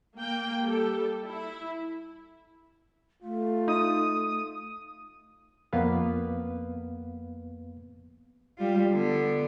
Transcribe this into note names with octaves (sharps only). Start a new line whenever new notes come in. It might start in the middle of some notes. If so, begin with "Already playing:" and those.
A#3 G5
G3 A4
E4
A3 F4
D#4 D#6
F2 A#3 B3 B4 F5
G3 F4
D3 B3